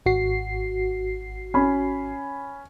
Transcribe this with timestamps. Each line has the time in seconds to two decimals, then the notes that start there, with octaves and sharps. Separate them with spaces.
0.06 G#1 F#4 C7
1.54 C#4 B5